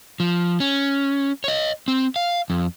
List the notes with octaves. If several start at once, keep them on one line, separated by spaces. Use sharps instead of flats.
F3
C#4
C#5 D#5
C4
F5
F2